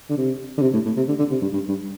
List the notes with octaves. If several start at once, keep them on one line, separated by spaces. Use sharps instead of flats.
D3
C3
D3
C3
A2
A2
C3
D3
D3
C3
G2
G2
G2